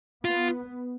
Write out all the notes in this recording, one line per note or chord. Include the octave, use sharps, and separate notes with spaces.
B3 F4